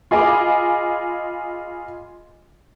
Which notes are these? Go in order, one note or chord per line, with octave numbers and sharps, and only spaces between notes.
F4 G#4 D#5 G#5 B5 D6